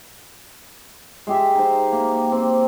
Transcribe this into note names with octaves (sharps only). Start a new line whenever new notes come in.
G#3 G4 E5
D#4 C5
A#3
C4